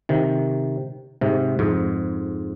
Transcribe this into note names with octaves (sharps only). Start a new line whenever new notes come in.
C3 D#3
G#2 C3
F2 G#2